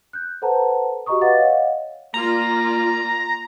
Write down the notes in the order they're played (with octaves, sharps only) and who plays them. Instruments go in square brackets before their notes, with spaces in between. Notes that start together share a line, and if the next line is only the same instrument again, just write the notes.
[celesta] F#6 G6
A4 B4 C5 F#5 A5 A#5
F#4 G4 D#5 A#5 C#6 D#6
B4 D#5 F5 F#5 D6 A6
C#5 D#5 F5 F#5
[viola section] A#3 F4 D5 [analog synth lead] A#5